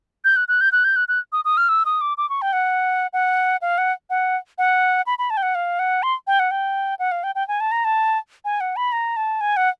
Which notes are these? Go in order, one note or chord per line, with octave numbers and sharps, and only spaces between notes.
G6
F#6
F#6
G6
F#6
G6
F#6
F#6
D#6
D#6
F6
E6
D#6
D6
D6
C#6
G5
F#5
F#5
F5
F#5
F#5
F#5
B5
B5
A5
G5
F#5
F5
F#5
C6
G5
F#5
G5
F#5
F5
G5
G5
G#5
A5
A#5
A5
G#5
F#5
B5
A#5
A5
G#5
F#5